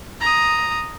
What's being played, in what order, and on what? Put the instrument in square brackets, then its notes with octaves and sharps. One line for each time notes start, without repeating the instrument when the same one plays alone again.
[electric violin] A#5 D#6